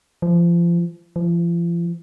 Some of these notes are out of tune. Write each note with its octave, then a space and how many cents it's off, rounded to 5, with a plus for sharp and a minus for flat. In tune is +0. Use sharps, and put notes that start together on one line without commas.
F3 -30
F3 -40